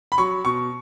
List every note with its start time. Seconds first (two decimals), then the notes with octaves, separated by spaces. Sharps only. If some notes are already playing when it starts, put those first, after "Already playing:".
0.12 B5
0.18 F#3 C#6
0.45 B2 C#6